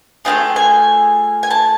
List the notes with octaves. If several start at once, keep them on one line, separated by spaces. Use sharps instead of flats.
A3 C4 F4 G#4 G5
G#5
G#5
A5